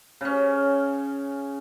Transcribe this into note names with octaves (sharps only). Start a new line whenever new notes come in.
C#3 C#4